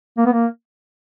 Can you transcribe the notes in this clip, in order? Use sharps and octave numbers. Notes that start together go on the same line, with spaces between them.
A#3
B3
A#3